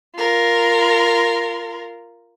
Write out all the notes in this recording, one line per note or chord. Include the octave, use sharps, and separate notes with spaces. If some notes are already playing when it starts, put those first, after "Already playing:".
F4 A#4